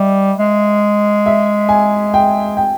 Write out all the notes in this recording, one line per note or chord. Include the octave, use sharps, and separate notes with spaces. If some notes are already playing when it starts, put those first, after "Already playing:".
Already playing: G3 D#5 E5
G#3
E5
G#5
G5
G5